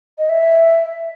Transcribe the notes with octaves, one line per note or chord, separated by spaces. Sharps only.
D#5
E5